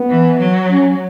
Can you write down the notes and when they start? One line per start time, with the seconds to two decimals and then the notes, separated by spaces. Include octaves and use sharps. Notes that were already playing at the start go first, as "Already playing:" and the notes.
Already playing: B3
0.09 E3
0.40 F#3
0.71 C#4